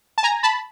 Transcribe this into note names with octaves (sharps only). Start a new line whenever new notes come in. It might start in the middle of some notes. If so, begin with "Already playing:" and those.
A5
G#5 A#5
A5 B5